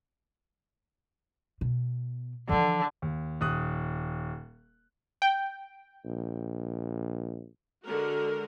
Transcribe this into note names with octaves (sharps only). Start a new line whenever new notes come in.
B2
D3 E3 F3
D#2
D#1 D#6 F#6
G5
A#1
D3 G#3 F#4 A#4